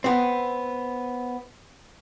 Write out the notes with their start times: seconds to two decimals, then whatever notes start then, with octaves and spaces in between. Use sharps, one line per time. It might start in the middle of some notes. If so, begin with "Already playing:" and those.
0.04 B3 C4